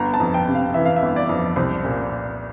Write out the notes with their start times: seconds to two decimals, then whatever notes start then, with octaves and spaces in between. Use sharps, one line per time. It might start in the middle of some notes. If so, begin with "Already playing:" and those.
Already playing: G1 A#5
0.14 A5
0.20 F2
0.34 G5
0.47 C3
0.55 F5
0.74 E3 E5
0.85 F5
0.96 E5
1.02 G1
1.16 D5
1.29 F2
1.56 C2 C5
1.84 A#2